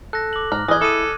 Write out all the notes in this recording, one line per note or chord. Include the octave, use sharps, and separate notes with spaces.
A4 F#6 A#6
D6 F#7
G#2 A#5 F6
E3 G#4 B4 D#5 D#6 F#6 G#6 A#6
E4 A4 D6 D#7